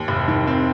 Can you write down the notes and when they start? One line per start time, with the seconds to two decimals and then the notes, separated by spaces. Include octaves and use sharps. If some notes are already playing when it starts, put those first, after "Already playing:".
Already playing: D#2
0.08 F1
0.28 D#3
0.47 C4